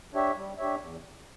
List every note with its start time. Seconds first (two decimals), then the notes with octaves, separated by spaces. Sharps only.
0.14 D4 G4 C#5 E5
0.36 G3
0.58 D4 G4 C#5 E5
0.80 E2